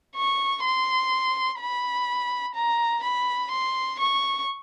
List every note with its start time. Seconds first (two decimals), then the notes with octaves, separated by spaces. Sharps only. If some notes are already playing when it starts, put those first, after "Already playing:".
0.16 C#6
0.64 C6
1.60 B5
2.55 A#5
3.03 B5
3.51 C6
3.99 C#6